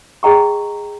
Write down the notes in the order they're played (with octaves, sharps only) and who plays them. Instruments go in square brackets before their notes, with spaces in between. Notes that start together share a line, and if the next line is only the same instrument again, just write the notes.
[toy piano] G#4 D#5 G5 A#5 C#6